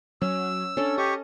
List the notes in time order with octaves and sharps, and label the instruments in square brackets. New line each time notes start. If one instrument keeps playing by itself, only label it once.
[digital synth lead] F#3 [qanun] C#4 [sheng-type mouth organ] E6
[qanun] C#4 A4 [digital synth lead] D4
[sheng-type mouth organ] G4 C#6 [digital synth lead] D#5